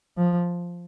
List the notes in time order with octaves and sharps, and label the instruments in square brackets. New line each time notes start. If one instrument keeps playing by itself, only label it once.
[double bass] F3